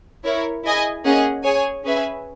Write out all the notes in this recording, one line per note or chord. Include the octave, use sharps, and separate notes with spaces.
E4 A#4 C#5
E4 G#4 D#5 G#5
A#3 C#4 G#4 D#5 F#5
G#4 C#5 G#5
C#4 G#4 B4 E5 G#5